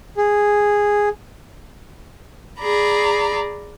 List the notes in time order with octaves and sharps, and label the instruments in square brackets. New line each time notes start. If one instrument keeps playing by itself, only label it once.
[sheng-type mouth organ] G#4
[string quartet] G#4 D5 A#5 B5